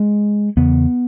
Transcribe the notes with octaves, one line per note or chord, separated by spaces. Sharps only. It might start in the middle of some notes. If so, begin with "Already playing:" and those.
Already playing: G#3
E2 C#3 B3